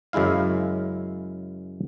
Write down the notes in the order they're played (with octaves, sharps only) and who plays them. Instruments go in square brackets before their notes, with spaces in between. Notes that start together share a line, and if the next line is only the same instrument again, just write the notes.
[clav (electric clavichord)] F#2 C#3 G#3 E4 F5